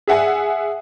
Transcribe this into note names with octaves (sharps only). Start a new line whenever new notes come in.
G#4 E5 F#5 G#5